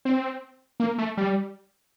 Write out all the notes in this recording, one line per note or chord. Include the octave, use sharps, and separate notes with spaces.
C4
A#3
A3
G3